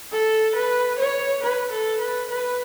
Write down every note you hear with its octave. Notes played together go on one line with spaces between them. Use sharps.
A4
B4
C#5
B4
A4
B4
B4